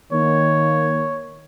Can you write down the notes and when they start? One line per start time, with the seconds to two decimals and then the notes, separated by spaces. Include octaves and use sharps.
0.13 D#3 A#3 C#5